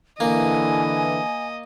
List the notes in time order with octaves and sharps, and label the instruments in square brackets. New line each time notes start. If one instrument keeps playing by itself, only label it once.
[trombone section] D3 E3 [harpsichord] A#3 [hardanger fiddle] D#5 [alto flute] G#5